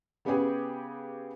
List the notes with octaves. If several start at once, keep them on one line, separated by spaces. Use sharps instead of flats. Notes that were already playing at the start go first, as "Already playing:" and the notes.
C#3 B3 C#4 G4 G#4